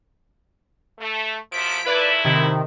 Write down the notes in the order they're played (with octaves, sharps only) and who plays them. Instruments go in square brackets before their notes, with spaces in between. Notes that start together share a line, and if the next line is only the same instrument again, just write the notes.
[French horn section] A3
[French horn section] F#2 C3 F3 [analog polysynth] B6 D7
[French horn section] A#2 A3 E4 [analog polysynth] B4 D5
[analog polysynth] C3 D#3